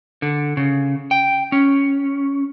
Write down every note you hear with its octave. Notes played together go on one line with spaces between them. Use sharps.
D3
C#3
G5
C#4